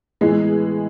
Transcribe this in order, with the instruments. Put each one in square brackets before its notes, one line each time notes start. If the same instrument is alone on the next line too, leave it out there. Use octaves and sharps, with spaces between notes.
[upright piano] A2 E3 B3 [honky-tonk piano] G#3 G#4